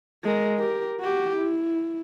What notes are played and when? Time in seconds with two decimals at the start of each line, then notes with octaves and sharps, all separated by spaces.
0.24 G#3 A#4
0.58 G4 A#4
1.00 F#4 G4
1.36 E4